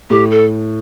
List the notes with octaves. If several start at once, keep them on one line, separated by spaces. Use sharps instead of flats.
A2 G4
A4